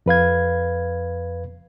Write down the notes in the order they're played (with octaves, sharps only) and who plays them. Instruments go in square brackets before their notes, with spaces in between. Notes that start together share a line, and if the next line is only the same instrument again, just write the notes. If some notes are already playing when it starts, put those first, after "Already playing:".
[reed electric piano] F2 B4 F5 G#6